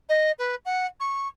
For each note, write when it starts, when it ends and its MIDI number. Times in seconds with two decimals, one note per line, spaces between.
0.09 0.32 75
0.39 0.55 71
0.65 0.86 78
1.00 1.28 85